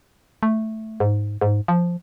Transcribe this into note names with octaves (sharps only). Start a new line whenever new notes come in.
A3
G#2
G#2
F3